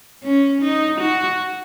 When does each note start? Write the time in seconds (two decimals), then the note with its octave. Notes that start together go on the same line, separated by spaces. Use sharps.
0.23 C#4
0.62 D#4
1.01 F#4